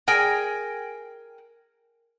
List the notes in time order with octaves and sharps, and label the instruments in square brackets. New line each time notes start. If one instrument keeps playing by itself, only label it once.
[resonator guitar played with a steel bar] G#4 A#4 G5 G#5